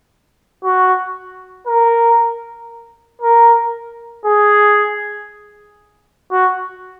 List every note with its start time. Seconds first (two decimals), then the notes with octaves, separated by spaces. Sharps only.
0.64 F#4
1.67 A#4
3.22 A#4
4.25 G#4
6.32 F#4